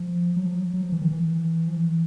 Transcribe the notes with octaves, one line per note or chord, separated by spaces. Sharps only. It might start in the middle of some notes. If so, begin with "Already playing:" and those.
Already playing: F3
F#3
F3
F#3
F#3
F3
E3
D#3
E3
F3
E3